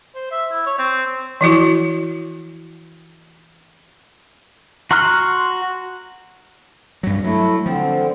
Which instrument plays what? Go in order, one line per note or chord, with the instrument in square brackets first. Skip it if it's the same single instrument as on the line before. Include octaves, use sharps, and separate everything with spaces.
[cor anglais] C5
E5
E4
C#5
C4
[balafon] E3 F3 E4 F#4
[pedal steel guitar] F#4 A#5 C6 F6 F#6
[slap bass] G2 F#3
[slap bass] F#3 [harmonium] A3 E4
[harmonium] D3 C4 [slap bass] F3